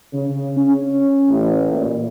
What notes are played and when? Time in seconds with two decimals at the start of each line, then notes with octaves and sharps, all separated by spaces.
0.13 C#3
0.57 C#4
1.29 A1
1.71 A#2